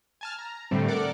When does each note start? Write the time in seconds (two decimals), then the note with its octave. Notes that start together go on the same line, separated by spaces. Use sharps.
0.21 G#5 A5 F6
0.39 A#5
0.71 A2 D3 G3 A3 C4
0.88 A4 A#4 D5 F#5 D6